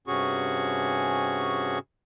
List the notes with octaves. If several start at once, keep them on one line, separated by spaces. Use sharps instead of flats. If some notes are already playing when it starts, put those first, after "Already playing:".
G2 C3 C#4 F#4 G#4 C#6